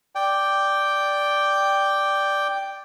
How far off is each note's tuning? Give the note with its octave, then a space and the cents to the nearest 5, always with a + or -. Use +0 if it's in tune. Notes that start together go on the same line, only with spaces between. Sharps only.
D5 +0 G5 +0